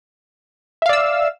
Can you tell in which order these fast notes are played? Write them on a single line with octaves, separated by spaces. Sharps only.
E5 F5 D5 E6